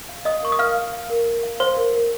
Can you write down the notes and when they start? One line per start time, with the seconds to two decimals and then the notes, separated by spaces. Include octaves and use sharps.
0.09 F5
0.25 D#5 F5 D#6
0.42 A#4 C#6
0.52 D#6
0.59 A#4 F5 F6
0.76 F5
0.93 F5
1.10 A#4
1.26 A#4
1.43 F5
1.60 C5 F5 C6
1.77 A#4
1.93 A#4